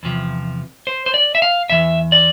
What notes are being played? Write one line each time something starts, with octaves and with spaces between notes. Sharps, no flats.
E2 C3 F3
C5
C5
D5
E5
F5
E2 E3 E5
D5